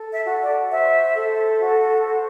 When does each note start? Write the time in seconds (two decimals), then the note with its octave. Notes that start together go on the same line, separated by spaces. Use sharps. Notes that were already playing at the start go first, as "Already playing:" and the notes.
Already playing: A4
0.11 E5
0.26 F#4
0.40 D5
0.70 C5 E5
1.14 A4
1.58 F#4
2.01 C5